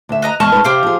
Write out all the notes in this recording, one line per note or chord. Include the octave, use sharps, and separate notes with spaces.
D2 E5
B4 D#5 A#5
E2 G#3 D#5 A5 C#6 F6
G#3 D#4 B4
C3 G4 C5 F5
F3 G#4